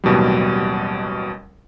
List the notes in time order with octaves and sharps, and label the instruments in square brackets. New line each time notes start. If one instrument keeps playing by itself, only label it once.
[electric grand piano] A1 D#2 B2 F#3 G3